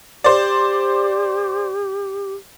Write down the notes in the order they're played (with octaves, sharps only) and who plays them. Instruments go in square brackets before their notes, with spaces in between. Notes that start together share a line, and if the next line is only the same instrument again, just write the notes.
[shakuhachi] G4 [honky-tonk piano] C5 D5